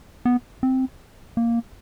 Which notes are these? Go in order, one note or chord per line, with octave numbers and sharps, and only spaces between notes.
B3
C4
A#3